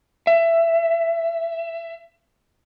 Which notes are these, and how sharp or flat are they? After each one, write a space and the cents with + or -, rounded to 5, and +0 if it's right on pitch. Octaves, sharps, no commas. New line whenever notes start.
E5 +20